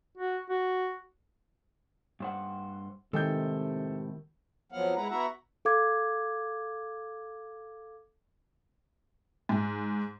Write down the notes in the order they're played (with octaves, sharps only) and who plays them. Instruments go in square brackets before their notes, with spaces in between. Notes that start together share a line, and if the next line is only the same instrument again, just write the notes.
[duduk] F#4
F#4
[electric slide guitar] G2 C5 F#5
[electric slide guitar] A2 G#3 [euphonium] C3 [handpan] D#3 [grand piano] A4 G5 G6
[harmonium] F2 F3 F#3 B3 F5 F#5
G#3 E4 B4 F#5 A#5
B3 E4 F#4 E5 F#5 A#5
[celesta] A4 F5 D6 G#6
[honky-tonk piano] G#2